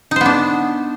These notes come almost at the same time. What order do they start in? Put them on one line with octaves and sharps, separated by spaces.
D#4 C5 B3 D4